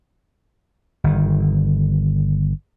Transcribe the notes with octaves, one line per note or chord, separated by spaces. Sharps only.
G1 D#3